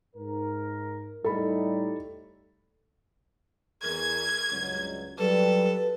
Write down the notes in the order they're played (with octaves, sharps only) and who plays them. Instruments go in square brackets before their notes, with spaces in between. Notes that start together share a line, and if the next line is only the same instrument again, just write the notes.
[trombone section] G#2 A#4
[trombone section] A2 G3 D#4 [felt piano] A4 B5
[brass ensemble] E2 G#4 A#4 [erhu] G#6
[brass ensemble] C#2 G2 F#3
[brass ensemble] F#3 G3 [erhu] A4 [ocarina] B4